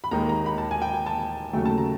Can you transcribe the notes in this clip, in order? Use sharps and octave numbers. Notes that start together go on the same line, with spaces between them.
B5
D#2 D#3 G#3 A#5
A#5
B5
A5
G#5
G5
G#5
A5
D#2 C#3 F#3 A3 G5
A5
A#5